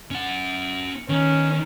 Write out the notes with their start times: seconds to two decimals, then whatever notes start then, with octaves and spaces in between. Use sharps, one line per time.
0.11 C#4 F#5
1.09 D#3 C#4